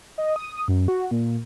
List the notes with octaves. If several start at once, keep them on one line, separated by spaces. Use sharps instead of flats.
D#5
D#6
F#2
F#4
A#2